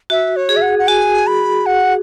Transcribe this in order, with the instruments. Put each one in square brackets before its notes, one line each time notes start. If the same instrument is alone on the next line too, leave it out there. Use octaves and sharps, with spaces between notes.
[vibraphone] F#4 [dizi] E5
[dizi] C#5
[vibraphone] G#4
[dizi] E5
F#5
F#5
[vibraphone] F#4 [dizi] G#5
[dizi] B5
F#5